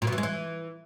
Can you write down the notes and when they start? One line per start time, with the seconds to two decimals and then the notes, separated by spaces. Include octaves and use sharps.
0.02 A#2
0.07 B2
0.13 E3
0.18 G#3
0.23 E3